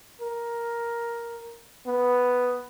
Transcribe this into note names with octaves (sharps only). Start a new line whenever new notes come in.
A#4
B3